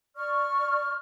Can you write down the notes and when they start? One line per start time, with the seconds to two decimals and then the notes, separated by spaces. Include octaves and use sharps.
0.17 D5 C#6 F6